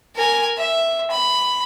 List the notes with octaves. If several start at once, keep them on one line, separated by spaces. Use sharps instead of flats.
A#4 G#5
E5
B5